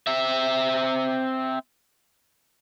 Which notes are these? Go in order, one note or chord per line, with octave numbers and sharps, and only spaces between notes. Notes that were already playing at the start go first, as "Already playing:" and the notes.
C4 E5